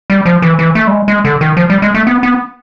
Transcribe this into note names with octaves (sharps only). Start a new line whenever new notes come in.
G3
F3
E3
E3
A3
G3
G#3
G#3
D3
D#3
F3
G3
G#3
A3
B3
B3